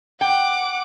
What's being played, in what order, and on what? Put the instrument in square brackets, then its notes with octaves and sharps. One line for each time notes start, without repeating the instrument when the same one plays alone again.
[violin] F#5 D6 [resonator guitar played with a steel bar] G5